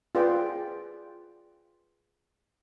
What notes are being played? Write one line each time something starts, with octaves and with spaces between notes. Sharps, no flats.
F4 G#4 B4 D5 F#5 G5